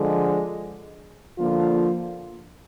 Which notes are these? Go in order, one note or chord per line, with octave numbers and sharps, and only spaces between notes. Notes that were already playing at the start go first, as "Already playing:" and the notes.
Already playing: D3 F3 G#3
D3 F3 A#3 F4